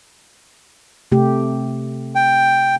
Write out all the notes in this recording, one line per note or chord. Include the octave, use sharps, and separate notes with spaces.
C3 A3 G4
G5